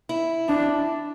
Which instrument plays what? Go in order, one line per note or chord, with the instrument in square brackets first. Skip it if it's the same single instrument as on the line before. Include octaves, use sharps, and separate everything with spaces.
[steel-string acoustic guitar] E4
[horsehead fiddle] D4